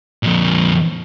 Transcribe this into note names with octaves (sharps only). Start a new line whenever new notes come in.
F2 A#2